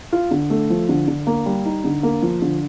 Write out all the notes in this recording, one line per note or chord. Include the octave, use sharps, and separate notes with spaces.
F4
D3
A3
F3
D3
D3
A#3
G3
D#4
D3
A#3
F3
D3